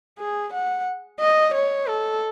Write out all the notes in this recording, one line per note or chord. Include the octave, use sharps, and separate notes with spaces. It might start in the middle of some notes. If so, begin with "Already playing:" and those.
G#4
F#5
D#5
C#5
A4